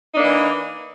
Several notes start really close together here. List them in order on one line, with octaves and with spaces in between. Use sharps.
D#4 D4 A#3 E3